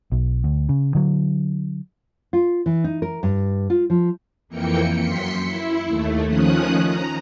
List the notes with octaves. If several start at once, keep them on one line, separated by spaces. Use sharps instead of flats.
B1
D2
C#3
D3 F#3
F4
E3
D#4
A#4
G2
F4
F3
F2 E3 A#3 G5 C#7
F#2 C6 B6 C#7
E4
D#2 A3
D#3 F3 C#4 D#6 F#6
A#5